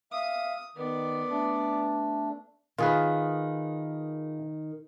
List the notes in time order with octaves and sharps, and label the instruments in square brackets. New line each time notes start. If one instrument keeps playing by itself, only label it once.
[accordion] E5 F5 [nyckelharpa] D#6
[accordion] D#3 [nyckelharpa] B3 D5
[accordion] A3 D4
[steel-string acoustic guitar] D#3 [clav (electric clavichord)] F4 G#4 B4